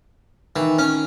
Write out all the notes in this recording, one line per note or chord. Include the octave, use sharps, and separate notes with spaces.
D#3 E3
C#4